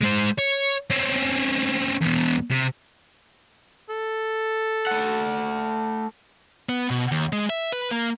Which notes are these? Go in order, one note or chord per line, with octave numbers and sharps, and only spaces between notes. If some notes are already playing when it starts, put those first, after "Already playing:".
G#3 C5
C#5
C4 C#4
E2 B2
C3
A4
A3 F#5
B3
B2
D#2
G#3
E5
B4
A#3